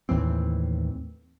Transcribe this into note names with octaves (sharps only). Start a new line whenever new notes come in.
D#2 A2 E3 C4